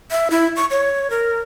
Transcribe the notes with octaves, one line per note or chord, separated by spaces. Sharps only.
E5
E4
C#6
C#5
A#4